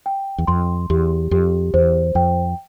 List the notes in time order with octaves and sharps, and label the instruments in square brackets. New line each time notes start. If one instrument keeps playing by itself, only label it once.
[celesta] G5
[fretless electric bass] E2
[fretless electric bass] F2 [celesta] C6
[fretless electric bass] E2 [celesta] G4
[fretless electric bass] F2 [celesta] G4
[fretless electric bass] E2 [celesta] C5
[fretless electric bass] F2 [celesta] G5